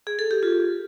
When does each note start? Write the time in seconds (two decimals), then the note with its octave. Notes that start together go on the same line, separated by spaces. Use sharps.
0.07 G#4
0.19 A4
0.31 G4
0.43 F4